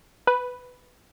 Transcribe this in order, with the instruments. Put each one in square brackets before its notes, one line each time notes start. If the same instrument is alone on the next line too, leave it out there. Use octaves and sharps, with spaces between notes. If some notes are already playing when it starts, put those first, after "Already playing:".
[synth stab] B4